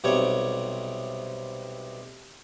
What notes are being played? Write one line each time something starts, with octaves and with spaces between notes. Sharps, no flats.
B1 C3 G3 C#5